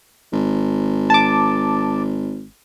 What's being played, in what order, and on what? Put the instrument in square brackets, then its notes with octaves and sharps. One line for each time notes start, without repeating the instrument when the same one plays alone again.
[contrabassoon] G#1
[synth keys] A5 D6